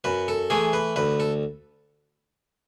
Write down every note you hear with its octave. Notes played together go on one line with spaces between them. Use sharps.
F#2 B4
A4
E3 A3 G#4
B4
D2 B4
A4